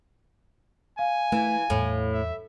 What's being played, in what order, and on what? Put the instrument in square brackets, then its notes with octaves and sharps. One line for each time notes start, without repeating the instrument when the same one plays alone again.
[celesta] F5 [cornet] G#5
[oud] E3 [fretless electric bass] A3
[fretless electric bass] E2 [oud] A2
[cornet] E5